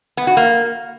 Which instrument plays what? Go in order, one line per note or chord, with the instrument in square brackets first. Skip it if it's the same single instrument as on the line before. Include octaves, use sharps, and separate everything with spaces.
[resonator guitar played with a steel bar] B3
F#4
A#3